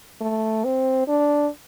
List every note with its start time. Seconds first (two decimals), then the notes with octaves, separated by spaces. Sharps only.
0.21 A3
0.64 C4
1.08 D4